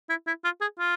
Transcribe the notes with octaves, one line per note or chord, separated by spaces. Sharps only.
E4
E4
F4
G#4
F4